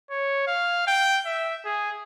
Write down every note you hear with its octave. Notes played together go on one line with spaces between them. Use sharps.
C#5
F5
G5
E5
G#4